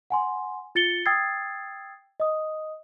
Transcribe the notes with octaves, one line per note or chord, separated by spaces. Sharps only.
F#5 G#5 C6
F4 A6 C#7 G7
G5 D#6 E6 G#6 A6 C7
D#5 D#6